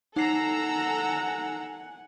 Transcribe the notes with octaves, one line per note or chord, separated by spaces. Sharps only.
D#4 A4 F#5 G#5 A#5 E6 C7